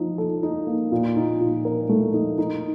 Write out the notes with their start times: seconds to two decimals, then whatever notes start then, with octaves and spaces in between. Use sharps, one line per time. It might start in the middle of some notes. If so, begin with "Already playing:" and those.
Already playing: F3 D#4
0.18 A4
0.43 D#4
0.67 A#3
0.92 A#2
1.16 D#4
1.41 A#2
1.65 A#4
1.89 A3
2.14 D#4
2.38 D#4